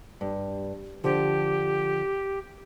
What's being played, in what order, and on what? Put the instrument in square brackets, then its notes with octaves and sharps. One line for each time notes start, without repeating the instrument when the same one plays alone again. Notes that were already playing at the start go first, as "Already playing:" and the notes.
[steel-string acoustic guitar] G2
[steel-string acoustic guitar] D3 F3 [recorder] G4